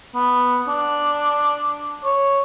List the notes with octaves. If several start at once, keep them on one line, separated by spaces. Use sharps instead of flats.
B3
D4
C#5